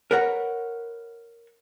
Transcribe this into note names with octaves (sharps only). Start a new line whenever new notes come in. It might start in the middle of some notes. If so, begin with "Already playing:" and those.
A#4 B4 C#5 F#5 A#5